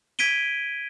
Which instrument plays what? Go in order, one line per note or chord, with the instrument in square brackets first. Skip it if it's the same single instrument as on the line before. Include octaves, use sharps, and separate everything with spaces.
[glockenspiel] G#6 B6 D7 D#7 G7